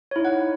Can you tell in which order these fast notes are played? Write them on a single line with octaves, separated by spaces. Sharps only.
C#5 E4 D#4 F#5